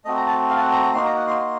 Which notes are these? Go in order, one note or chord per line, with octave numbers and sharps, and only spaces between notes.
A3 C4 F#4 D#5
A#5
A5
F5
A5
F#5
A#5
A#5
A#3 D#4 F#4 C6
A#5
F#5
C6
C6